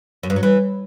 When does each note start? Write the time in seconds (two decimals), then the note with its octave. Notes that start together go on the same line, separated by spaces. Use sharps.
0.23 F#2
0.30 G2
0.36 F#3
0.43 E3